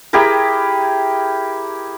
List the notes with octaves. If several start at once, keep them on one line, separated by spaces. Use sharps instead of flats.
E4 G4 G#4 A#4